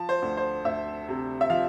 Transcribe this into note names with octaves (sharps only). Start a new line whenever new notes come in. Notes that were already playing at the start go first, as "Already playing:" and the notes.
Already playing: F3 A5
C5
D2
C5
D2 E5
C3
E5
F3 F5